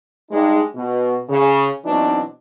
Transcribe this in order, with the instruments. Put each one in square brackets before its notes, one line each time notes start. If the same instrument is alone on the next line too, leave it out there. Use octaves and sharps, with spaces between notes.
[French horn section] G2 G#3 D#4
B2
C#3
B2 E3 F#3 C4 D4 D#4